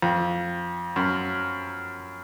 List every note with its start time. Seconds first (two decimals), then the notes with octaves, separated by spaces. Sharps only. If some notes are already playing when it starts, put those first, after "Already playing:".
0.02 F2
0.96 F#2